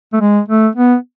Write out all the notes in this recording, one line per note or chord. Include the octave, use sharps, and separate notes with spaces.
A3
G#3
A3
B3